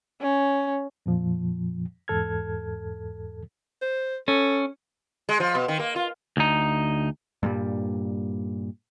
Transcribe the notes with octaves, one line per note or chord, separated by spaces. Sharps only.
C#4
F2 A#2 F3
E2 G#2 A4 F6 G#6
C5
C#4 A4
G#3
F3
B2
D#3
A#3
F4
D2 D#4
G2 A#2 G3